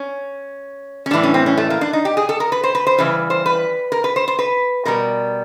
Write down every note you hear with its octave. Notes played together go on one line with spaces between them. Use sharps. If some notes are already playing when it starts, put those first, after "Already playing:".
Already playing: C#4
C#4
A2 E3 G3 D4
C#4
C4
C#4
A3
A#3
D4
D#4
G4
G#4
A4
A#4
B4
C5
B4
C5
C#3 E3 G3 B4
C5
B4
A#4
B4
C5
C5
B4
B2 G3 A#4